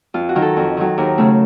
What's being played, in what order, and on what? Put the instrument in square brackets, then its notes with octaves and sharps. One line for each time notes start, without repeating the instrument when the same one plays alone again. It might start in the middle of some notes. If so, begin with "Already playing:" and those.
[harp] F2 F4
F#4
D#3 F#3
A4
F2
D#3 F#3
D#2 A#4
C#3 A3